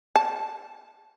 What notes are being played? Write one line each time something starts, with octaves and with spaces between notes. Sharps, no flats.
A5